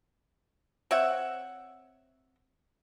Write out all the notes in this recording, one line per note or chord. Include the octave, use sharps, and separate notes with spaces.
C4 C#5 E5 F#5